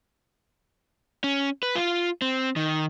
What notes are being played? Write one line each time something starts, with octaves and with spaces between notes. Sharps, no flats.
C#4
B4
F4
C4
D#3